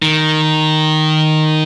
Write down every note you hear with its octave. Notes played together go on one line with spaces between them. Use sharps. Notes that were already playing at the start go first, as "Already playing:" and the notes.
D#3